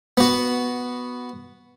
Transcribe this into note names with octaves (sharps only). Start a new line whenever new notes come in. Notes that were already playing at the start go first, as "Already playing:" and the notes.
B3 F#4